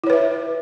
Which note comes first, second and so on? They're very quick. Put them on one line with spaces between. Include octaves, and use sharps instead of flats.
E4 C#5 B4 E5